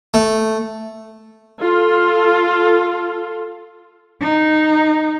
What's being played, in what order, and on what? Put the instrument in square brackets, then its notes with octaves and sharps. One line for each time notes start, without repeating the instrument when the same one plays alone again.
[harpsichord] A3
[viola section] F4 A4
[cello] D#4